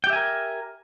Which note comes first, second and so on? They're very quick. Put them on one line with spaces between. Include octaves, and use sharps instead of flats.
G5 G4 E5 G#5 A#4